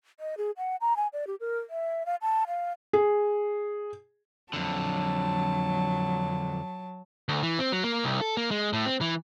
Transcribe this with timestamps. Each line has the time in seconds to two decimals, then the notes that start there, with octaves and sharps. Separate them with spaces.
0.20 D#5
0.37 G#4
0.57 F#5
0.81 A#5
0.96 G#5
1.13 D5
1.27 G4
1.40 A#4
1.70 E5
2.06 F5
2.22 A5
2.48 F5
2.93 G#4
4.53 F2 D3 F#3 A5
7.29 D2
7.43 E3
7.59 C4
7.72 F#3
7.84 A#3
8.04 C2
8.21 A4
8.37 A#3
8.51 G#3
8.73 A2
8.86 C4
9.01 E3